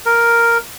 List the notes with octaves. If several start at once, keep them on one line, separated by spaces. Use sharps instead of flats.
A#4